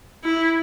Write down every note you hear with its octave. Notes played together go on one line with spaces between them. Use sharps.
E4